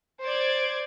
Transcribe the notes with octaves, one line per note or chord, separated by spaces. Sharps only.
C5 D5 G#6